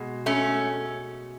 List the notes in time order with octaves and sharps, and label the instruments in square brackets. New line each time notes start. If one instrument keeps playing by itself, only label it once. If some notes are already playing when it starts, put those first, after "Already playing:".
Already playing: [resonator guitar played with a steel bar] B2 G#3
A3 C#4